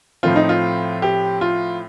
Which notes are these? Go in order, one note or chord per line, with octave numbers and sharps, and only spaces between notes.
A2 F3 A3 C4 F4
D#4
F4
G4
F4